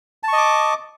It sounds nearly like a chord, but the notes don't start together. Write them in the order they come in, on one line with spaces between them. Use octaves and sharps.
A5 C#6 D#5 D6